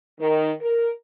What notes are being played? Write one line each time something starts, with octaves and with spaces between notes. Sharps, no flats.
D#3
A#4